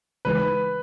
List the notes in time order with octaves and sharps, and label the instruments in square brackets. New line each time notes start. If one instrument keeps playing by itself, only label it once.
[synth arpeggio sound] C#3 E3 G#3 D#4 [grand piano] B4